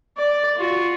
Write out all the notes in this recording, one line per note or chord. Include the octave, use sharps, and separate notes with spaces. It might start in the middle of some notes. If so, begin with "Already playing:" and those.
D5
F4 F#4